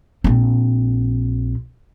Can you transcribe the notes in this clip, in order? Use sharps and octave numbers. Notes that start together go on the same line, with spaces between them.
A#1 C4